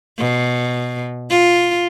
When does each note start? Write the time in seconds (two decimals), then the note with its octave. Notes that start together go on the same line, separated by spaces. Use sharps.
0.18 B2
1.30 F4